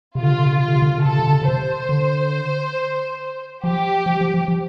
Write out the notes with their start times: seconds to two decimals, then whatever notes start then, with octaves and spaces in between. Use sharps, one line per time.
0.15 C3 F4
0.22 D3
0.31 C3
0.38 D3
0.46 C3
0.52 D3
0.59 C3 F4
0.68 D3
0.75 C3
0.82 D3
0.90 C3
0.98 D3
1.02 C3 A4
1.12 D3
1.19 C3
1.27 D3
1.34 C3
1.41 D3
1.46 C3 C5
1.89 D3
3.62 F3 G4
4.06 F3
4.21 F3
4.34 F3
4.48 F3